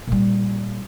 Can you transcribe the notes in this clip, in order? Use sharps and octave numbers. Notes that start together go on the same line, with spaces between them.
A#2 G3